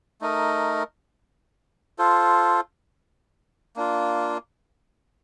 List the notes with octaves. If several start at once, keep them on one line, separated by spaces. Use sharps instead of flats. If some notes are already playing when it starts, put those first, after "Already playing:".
A3 D#4 A#4 D#5
F4 A4 C5
A#3 D4 F4